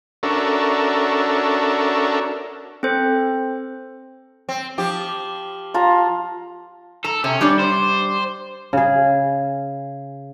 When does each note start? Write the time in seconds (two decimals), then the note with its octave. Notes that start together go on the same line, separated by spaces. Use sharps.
0.23 C#4 D4 F#4 A4 A#4 E5
2.83 C4 A4 C5
4.49 C4
4.78 F3 G4
5.74 F4 A5 A#5
7.04 A4 A#5
7.24 C3 C#4
7.41 G3 D4 D5
7.59 C5
8.73 C#3 G#4